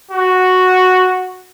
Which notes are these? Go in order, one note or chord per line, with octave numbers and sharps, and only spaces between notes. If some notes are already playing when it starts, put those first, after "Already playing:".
F#4